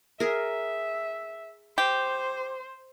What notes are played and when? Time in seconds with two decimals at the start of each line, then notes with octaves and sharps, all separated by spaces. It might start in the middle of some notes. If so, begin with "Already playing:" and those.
0.20 G#4 A#4 E5
1.78 G4 C5